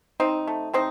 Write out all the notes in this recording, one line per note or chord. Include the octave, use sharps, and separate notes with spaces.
C3 C4 D#4
A3
C3 C4 D#4